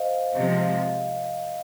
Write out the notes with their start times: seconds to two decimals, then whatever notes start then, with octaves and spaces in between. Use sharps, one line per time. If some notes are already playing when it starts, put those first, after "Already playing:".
Already playing: C5 D#5 F5
0.35 C3 F3 G#3 D#5
0.62 F5